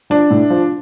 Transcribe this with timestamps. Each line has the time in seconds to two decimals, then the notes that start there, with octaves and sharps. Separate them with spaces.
0.10 F3 D4
0.31 A2
0.50 F3